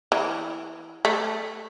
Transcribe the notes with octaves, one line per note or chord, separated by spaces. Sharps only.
E3
A3